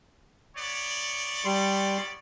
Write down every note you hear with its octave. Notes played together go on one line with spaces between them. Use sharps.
B3 C#5 D5
G3 C6